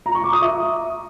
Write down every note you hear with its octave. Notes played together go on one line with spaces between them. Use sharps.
A#5
C#6
D6
D#6
E5